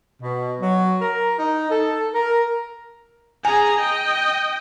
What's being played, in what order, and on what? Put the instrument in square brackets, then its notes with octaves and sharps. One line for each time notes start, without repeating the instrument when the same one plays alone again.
[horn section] B2
F#3
A#4
D#4
A4
A#4
[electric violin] G#4 A#5 [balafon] G#5
[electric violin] D#5 G5